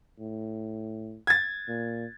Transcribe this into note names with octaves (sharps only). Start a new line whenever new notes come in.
A2
G#6 A6
A#2